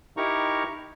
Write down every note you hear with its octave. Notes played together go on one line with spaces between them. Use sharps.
D#4 E4 G4 A#4 A#5 C#6